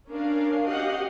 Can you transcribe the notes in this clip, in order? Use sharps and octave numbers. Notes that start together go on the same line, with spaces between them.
C#4 D4 A#4 F5
F#4 G4 D#5 F5 F#5